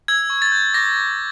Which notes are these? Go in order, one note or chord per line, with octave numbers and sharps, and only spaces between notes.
E6 G#6
C#6
A6
G6
D6 A#6
D6